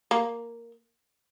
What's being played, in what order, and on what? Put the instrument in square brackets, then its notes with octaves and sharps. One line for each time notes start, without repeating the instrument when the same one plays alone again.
[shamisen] A#3